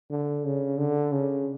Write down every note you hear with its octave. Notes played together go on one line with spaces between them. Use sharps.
D3
C#3
D3
C#3